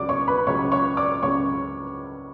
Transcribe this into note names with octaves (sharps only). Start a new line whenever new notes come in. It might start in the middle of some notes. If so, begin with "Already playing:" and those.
Already playing: C#2 C#3 F#3 D5 D6
C#5 C#6
B4 B5
C#2 C#3 F#3 C#5 C#6
C#5 C#6
D5 D6
C#2 C#3 F#3 C#5 C#6